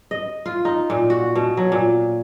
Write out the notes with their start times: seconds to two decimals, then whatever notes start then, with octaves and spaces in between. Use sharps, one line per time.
0.11 D#5
0.46 F4
0.65 D#4
0.90 A#2
1.10 F#4
1.35 B2
1.57 F#3
1.72 A#2